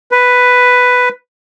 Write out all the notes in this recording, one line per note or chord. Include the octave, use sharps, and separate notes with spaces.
B4